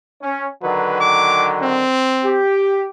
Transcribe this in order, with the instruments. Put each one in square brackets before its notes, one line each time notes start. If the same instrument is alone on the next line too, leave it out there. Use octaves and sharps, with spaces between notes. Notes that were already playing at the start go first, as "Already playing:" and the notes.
[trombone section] C#4
[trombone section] D3 D#3 F#3 [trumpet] B4
[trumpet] D6
C4
[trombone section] G4